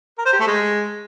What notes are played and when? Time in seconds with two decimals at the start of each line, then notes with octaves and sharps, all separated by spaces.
0.18 A#4
0.25 C5
0.33 G4
0.40 A3
0.47 G#3